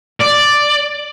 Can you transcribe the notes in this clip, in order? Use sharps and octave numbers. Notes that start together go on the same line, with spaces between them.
D5